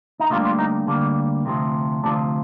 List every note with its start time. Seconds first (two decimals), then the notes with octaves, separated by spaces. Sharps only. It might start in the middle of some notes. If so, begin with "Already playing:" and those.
0.20 D#4
0.30 D2 D3 G3 A#3 F4
0.45 F4
0.59 D#4
0.87 D2 D3 G3 A#3
1.46 D2 C3 F3
2.04 D2 C3 F3 D4